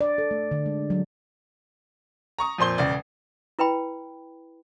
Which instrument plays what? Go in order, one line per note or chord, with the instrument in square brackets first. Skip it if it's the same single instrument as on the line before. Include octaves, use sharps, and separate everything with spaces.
[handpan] D5
A4
A3
D3
G#3
F#3
[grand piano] A#5 C#6 D#6
F2 A#2 C5 C6 G7
E1 C#3 D5
[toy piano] E4 B4 G5 B5